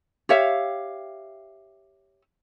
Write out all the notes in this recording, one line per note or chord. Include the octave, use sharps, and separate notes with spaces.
G4 C#5 E5 F5